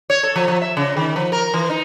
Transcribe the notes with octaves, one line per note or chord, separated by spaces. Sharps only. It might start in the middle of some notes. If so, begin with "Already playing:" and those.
C#5
A4
F3
F3
E5
C#3
D#3
F3
A#4
E3
D#4